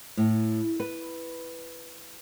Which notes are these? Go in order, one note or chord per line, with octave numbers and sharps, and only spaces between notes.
A2
B4